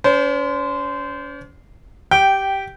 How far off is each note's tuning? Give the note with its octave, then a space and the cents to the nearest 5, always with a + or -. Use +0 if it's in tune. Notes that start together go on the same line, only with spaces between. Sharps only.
C#4 +40 C5 -20
G4 -5 G5 -15